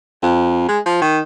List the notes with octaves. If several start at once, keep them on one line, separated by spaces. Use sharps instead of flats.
F2
G#3
F3
D#3